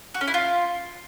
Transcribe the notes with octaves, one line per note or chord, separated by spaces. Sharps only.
F#4
C#4
E4
F4